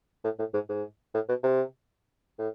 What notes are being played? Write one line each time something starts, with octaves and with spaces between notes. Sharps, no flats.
A2
A2
G#2
G#2
A2
B2
C3
A2